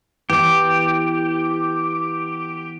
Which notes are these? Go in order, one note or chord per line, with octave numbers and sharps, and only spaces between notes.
E3 B3 G4